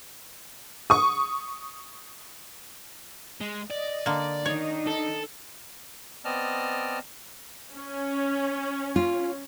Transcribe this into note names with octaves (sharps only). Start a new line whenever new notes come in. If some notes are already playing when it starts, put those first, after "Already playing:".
C#6 D#6
G#3
D5 D#5
D3 A#3
D#3 D4 D#4 C#5
A4
B3 C4 D5 D#5 A5 F6
C#4
F4